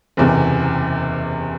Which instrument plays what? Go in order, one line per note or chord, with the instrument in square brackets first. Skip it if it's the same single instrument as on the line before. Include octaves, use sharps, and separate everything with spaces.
[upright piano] F#1 E2 C3